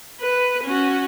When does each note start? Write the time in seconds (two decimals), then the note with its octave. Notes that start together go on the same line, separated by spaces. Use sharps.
0.20 B4
0.63 C#4 F#4